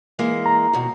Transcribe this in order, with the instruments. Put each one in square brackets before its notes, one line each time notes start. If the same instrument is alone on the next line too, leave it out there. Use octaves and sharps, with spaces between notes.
[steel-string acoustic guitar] E3 G#3 A#3
[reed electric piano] A#5
[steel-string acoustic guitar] D#2 B2